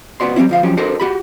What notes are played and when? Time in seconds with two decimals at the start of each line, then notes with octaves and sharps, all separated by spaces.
0.20 C#2 B3 F#4 D5 C6
0.36 F#3 G3 B3 C4 E4
0.49 D2 F3 F5
0.63 F3 F#3 C#4 G4
0.77 D4 F#4 A4 A#4 C5
1.00 F#4 G4 B5